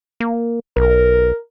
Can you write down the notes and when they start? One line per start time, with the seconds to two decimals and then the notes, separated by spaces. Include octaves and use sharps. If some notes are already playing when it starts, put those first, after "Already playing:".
0.20 A#3
0.77 B1 A#4